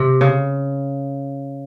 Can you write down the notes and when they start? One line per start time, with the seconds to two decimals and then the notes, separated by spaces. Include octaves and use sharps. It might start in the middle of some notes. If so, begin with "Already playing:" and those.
Already playing: C3
0.21 C#3